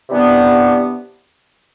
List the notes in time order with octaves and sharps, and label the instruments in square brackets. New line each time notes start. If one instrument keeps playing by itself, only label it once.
[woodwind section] C3 E3 G3 B3 D4